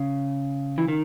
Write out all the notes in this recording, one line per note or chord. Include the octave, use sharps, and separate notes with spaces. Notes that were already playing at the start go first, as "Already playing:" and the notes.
Already playing: C#3
E3
D#3